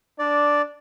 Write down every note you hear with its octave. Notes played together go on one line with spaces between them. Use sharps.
D4 D5